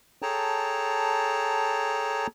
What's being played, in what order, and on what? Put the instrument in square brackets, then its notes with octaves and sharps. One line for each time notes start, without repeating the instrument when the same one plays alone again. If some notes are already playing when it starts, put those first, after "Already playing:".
[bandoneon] G#4 A4 C#5 G5 A5 A#5